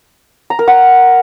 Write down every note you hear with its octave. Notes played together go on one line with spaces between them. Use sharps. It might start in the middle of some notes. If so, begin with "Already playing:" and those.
A#5
A#4
F#5